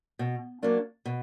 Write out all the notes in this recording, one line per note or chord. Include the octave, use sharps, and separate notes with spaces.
B2
F#3 A#3 D4
B2